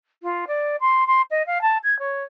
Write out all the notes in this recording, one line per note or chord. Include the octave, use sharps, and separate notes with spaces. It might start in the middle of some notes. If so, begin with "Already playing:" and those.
F4
D5
C6
C6
D#5
F5
A5
G#6
C#5